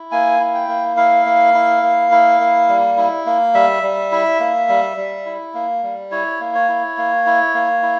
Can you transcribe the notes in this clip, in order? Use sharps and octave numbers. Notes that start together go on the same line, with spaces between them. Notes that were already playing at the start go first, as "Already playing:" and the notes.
Already playing: E4
A#3 G#5
E4
G5
A#3
E4 F5
A#3
E4
A#3
E4
A#3
G3
E4
A#3
G3 E5
G3
E4
A#3
G3
G3
E4
A#3
G3
E4 C#5
A#3
C#5
E4
A#3
E4
A#3
E4